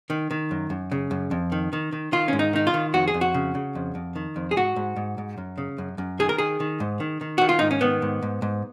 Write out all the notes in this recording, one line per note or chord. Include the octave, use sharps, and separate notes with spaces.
D#3
D#3
F#2
F#2
C#3
F#2
F2
D#3
D#3
D#3
D#3 F4
G#2 C#4
D#4
D#3 D#4
F4
D#3
F2 F#4
G#4
F2
F#4
C#3
C#3
F2
F2
D#3
F2
G#4
G#2 F#4
G#2
G#2
G#2
F#2
C#3
F#2
F#2
D#3 G#4
A#4
D#3 G#4
D#3
G#2
D#3
D#3
D#3 F#4
F4
G#2 D#4
C#4
D#3 B3
G#2
G#2
G#2